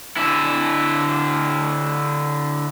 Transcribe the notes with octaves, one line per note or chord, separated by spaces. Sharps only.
D3 E4